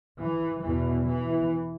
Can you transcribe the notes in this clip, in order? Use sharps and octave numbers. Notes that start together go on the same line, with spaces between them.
E3
E2 B2 E3
E3